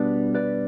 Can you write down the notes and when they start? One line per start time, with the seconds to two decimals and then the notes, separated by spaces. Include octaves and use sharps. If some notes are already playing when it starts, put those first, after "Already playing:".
Already playing: B2 G3 B3 D4 B4 D5
0.35 B4 D5